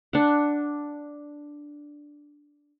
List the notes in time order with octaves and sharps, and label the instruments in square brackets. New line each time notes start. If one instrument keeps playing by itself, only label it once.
[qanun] D4 F#5